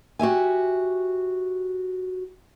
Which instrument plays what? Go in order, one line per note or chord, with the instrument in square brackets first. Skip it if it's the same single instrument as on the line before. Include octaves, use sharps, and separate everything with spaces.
[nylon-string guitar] F#4 G4 E5 G#5